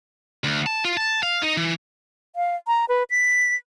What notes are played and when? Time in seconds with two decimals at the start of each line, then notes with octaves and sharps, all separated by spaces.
0.44 D2
0.66 A5
0.85 F4
0.97 A5
1.23 F5
1.42 D#4
1.57 E3
2.36 F5
2.67 A#5
2.89 B4
3.10 B6